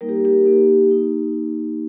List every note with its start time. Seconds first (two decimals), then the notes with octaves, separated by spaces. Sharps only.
0.01 G3 A#3 D#4 A#4
0.09 G4
0.25 G4
0.45 A#3 D#4
0.89 A#3 D#4